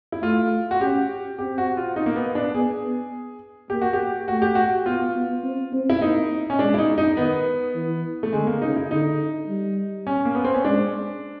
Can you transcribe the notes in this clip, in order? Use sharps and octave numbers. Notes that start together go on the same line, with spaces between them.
E4
A3 F4
F#4
C#4 G4
C4 G4
F#4
F4
D#4
A#3
B3
D4
B3 G#4
A#3 G4
F#4
G4
A3 F#4
G4
F#4
B3 F4
B3
C4
C4
E4
A#3 D#4
C#4
G#3 D4
E4
D#4
D#4
D#3 B3
E3
A3
D3 G#3
A#3
C#3 D#4
E4
D3 D#4
G3
C#4
A#3
B3
C4
C#4
G#3 D4